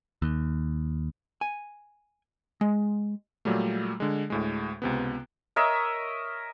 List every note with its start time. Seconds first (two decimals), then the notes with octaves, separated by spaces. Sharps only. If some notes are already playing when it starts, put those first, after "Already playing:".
0.22 D#2
1.41 G#5
2.61 G#3
3.45 A#2 F#3 G3 A3
4.00 D3 G#3
4.30 D2 A2 G#3
4.82 C#2 C3 B3
5.56 A#4 C#5 D#5 E5